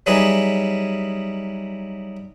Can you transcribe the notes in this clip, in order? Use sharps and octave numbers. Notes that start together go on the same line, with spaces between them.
F#3 G3 D#4 E4 G#4 B4